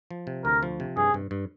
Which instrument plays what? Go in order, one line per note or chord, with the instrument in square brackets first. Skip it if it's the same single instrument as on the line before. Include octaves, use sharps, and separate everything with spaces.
[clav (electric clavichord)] F3
C3
[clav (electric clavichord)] D2 [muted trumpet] A#4
[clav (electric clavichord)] F3
C3
[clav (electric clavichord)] G2 [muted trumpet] G#4
[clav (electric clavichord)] G2
G2